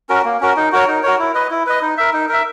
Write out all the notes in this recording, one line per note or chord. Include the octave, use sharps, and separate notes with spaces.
C#4 F#4 A#4
A#3
C#4 F#4 A#4
D#4
F#4 A#4 C#5
D#4
F#4 A#4 C#5
E4
B4 D#5
E4
B4 D#5
D#4
A#4 E5
D#4
A#4 E5